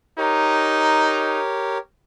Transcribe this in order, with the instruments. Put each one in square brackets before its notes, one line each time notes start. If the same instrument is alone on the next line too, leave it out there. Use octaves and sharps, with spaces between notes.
[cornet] D#4 [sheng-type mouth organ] G4 A#4 C#5